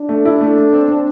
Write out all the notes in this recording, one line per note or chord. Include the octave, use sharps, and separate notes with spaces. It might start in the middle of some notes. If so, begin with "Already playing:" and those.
Already playing: D4
A3
E4
A3
A3
C4
C4